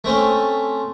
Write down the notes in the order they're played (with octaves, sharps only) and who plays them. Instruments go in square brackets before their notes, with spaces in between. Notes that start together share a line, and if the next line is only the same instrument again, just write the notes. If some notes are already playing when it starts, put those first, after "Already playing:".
[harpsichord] A3 C4 C#4